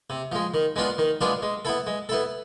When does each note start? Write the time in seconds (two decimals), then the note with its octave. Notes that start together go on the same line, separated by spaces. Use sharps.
0.10 C3
0.32 F3 G#3
0.54 D#3
0.76 G#3 B3 D4 F4
0.98 D#3
1.21 G#3 B3 D4 F4
1.42 G#3
1.65 B3 E4 A4
1.87 G#3
2.09 B3 E4 A4